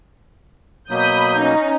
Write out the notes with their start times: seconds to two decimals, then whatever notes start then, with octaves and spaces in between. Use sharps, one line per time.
0.90 B2 F#3 A#3 B5 D#6 G6
1.38 C#4 D#4